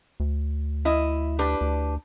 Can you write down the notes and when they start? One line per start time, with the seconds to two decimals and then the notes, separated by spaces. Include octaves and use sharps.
0.20 D2
0.85 E4 D#5
1.39 D4 G4 B4
1.61 D2